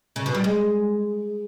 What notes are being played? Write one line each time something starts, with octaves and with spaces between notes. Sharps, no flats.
C#3
B2
G3
G#3